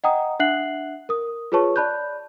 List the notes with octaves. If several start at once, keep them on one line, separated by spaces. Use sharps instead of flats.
D#5 F#5 G5 A#5 D#6
D4 E5 F#5 F#6 C7 F#7
A#4 D#6
F4 G#4 B4 C#5 A5 C#6
D5 A5 B5 F#6 G6